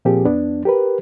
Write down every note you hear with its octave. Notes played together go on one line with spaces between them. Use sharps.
A#2 F3 A#3 C4 G4 G#4
F2 B3 D4
G4 A#4 B4